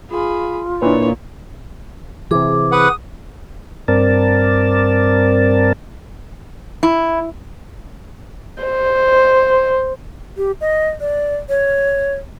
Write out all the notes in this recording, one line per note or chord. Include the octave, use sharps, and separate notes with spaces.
F4 G#4 B5
A#2 D4 E4 B4 C#5
C3 E3 G#4 D6
B4 F#5 D#6
G2 C4 A#4 D5 A5
E4
C5
G4
D#5
D5
C#5